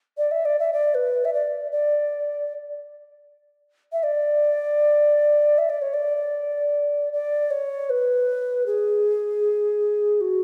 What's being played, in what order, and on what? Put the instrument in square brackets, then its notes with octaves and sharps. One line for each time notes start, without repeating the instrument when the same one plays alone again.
[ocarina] D5
E5
D5
E5
D5
B4
E5
D5
D5
E5
D5
E5
D5
C#5
D5
D5
C#5
B4
G#4
F#4